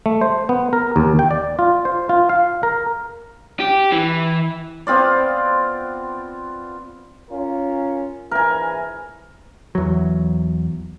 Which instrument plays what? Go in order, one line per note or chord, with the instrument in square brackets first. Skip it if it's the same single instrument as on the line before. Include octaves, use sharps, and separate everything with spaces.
[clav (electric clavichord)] A3
C5
B3
A#4
D#2
G5
D5
F4
C5
F4
F5
A#4
[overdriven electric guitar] G4
E3
[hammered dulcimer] B3 C4 F4 D5
[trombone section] C#4 F4 A#4
[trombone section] A#1 E3 [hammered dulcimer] A#4 G#5
[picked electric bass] E2 F#3